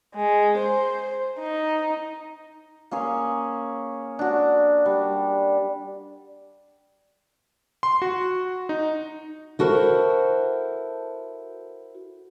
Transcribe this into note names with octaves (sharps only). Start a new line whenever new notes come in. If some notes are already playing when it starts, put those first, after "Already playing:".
G#3
C5
D#4
A#3 C#4 G#4 C#5
D4 F#4
G3
C6
F#4
D#4
E4 F#4 A4 A#4 C5